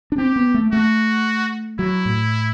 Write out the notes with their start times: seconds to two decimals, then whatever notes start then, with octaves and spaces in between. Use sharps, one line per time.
0.12 D4
0.18 C4 G4
0.36 B3
0.54 A3
0.73 A3 F#4
1.79 F#3 E4
2.05 A2